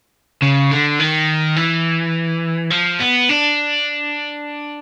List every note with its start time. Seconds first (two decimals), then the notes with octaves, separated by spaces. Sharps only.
0.42 C#3
0.71 D3
1.00 D#3
1.56 E3
2.71 F3
3.00 B3
3.29 D4